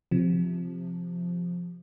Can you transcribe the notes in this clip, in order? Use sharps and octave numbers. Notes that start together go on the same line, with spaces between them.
C3 F3